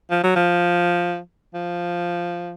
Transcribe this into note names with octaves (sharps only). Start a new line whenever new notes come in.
F3
F#3
F3
F3